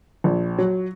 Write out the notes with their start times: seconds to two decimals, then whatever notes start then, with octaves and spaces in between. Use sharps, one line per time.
0.24 A#1
0.58 F#3